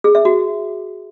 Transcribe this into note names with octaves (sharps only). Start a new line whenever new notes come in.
G#4
E5
F#4